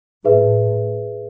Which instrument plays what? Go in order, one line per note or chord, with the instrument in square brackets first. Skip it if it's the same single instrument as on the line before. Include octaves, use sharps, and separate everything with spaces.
[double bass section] A2 [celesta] E4 G#4 B4 E5